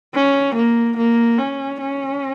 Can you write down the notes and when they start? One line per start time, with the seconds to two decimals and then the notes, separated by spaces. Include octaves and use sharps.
0.15 C#4
0.56 A#3
0.97 A#3
1.38 C#4
1.81 C#4